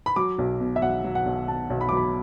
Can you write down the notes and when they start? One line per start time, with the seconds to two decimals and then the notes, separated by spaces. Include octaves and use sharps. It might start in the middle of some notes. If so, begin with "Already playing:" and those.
0.06 B5
0.16 F#3 D6
0.38 B1
0.60 B2
0.76 E5
0.82 B1 F#5
1.04 F#3
1.15 F#5
1.26 B1
1.48 B2 A5
1.70 B1
1.81 B5
1.89 D6
1.92 F#3 B5